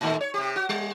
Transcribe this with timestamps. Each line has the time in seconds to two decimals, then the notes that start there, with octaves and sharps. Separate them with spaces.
0.01 A2 D#3 A3
0.21 C#5
0.34 C3 G4
0.56 F#4
0.69 G3